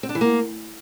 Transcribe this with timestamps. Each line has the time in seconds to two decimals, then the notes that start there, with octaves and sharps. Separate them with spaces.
0.03 C4
0.09 D4
0.15 E3
0.21 A#3